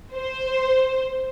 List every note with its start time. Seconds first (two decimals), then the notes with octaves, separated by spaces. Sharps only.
0.14 C5